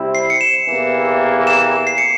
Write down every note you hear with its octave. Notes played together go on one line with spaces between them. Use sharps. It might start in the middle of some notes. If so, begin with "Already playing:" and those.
Already playing: C3 G3 C4 E4
C7
C#7
E7
E2 C3 E3 A#3
E7
C7
C#7